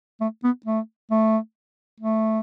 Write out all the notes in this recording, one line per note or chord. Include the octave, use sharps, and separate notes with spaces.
A3
B3
A3
A3
A3